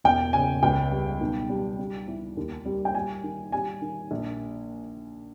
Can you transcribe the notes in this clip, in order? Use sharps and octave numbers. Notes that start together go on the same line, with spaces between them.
E1 G5
C#3 G#5
C#2 G5
G3
B1
G3
G3
E3
D#2
G3
G5
G3 G#5
D#3
G3 G#5
D#3
A#1